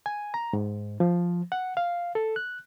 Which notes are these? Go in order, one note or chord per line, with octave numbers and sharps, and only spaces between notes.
G#5
A#5
G#2
F3
F#5
F5
A4
F#6